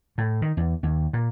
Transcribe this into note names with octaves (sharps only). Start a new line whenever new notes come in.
A2
D#3
E2
D#2
A#2